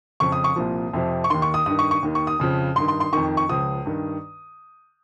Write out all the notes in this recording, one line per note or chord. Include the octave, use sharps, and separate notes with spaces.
F2 C#3 F3 C#6
D#6
C#6
C2 A#2 F3
F2 C3 F3
C#6
D#2 D#3 C6
C#6
D#6
G2 D#3 D#6
C#6
C#6
D#2 D#3
C#6
D#6
F2 C#3 F3
G2 D#3 C6
C6
C6
F2 D#3 C#6
C#6
C#2 C#3 F3 D#6
G2 D#3